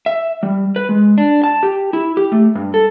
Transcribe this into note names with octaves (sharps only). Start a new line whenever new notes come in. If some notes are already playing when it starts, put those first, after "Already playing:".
E5
G3
B4
G#3
D4
A5
G4
E4
G4
A3
G2
A4